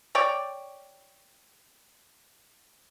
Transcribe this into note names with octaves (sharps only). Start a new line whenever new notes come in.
C#5 D5 G5